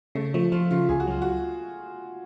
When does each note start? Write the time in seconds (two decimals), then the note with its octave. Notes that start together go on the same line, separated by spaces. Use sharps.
0.15 C#3 A3
0.34 F3 A3
0.52 F3 F4
0.71 C#3 F4
0.89 C#2 G#4
1.00 F#4
1.07 F#3 F4
1.22 F#4